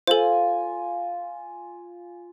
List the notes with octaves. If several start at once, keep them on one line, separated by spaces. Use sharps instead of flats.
F4 A4 C5 G#5